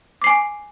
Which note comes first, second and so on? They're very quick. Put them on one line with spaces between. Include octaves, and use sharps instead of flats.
D6 C7 G#5